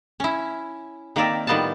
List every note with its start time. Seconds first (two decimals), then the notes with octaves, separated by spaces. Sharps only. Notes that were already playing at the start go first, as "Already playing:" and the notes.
0.20 C#4 E4
1.16 D#3 A#3 C4 A#4 D5 E5
1.47 A2 D#3 G3 B3 F4 A5